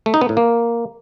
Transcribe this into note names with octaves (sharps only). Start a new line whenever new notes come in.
A3
D#4
B3
A2
A#3